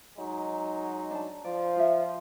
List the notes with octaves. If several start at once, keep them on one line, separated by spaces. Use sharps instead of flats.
F#3 G#3 D#4
D4 A5
F3 D5
F4 E5